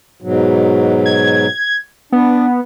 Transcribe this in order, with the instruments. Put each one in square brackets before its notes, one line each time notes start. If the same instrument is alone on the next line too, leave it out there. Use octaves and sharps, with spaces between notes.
[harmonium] G#2 B2 F#3
[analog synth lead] G#6
[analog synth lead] B3 [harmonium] D4